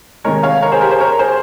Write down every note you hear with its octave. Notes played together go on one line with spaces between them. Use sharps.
C3 D#3 G#3 A#4 C#5
C#5 F5
A#4 C#5
G#4 C5
G4 A#4
G#4 C5
A#4 C#5
G#4 C5